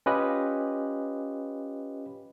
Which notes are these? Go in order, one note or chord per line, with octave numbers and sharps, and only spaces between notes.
C#4 F4 G4 B4 D#5